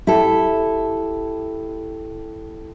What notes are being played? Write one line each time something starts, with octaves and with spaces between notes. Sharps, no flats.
E4 G4 A4